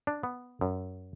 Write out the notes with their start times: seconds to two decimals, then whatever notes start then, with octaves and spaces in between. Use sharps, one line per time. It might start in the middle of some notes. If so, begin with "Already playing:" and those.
0.07 D4
0.23 B3
0.61 F#2